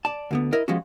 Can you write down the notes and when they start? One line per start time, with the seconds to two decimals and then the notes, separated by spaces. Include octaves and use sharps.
0.05 D5 A5
0.31 D2 D3 B3
0.53 E4 A#4 D#5
0.68 F3 G3 G#3 B3 C#4 F#4